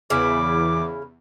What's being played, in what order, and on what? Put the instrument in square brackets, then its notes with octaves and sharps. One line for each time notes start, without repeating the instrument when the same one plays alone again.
[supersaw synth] E2 [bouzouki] C#3 E4 [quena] D6